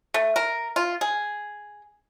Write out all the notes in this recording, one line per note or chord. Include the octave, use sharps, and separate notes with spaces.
A3
A#4
F4
G#4